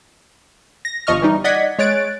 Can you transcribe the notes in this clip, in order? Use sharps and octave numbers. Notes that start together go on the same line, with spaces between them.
A#6
G1 F3 D#5 C#6 F6
E3 G3 D#4
D5 D#5 F#5 G#6 B6
G#3 C#5 F#6 A6 D7